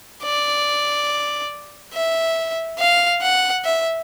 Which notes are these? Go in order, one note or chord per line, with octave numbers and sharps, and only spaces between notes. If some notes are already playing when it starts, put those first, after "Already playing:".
D5
E5
F5
F#5
E5